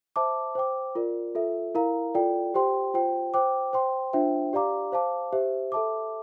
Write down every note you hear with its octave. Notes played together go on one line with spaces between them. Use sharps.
C5 E5 A5 D6
C5 G5 D6
F4 A#4 D5
F4 A4 E5
E4 A#4 F5 A#5
F4 A4 D5 G5
G4 C5 G5 C6
F4 C5 G5
C5 G5 D6
C5 G5 C6
D4 F4 C5 E5 G5
G4 D5 F5 A#5 D6
C5 F5 A5 D6
G4 C5 E5
A4 E5 A5 D6